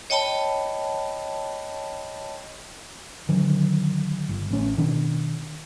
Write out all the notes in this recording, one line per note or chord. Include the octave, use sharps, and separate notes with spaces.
C#5 D#5 G5 A5 B5
D3 D#3 F#3
G1
A1 C#4
B2 D#3 D4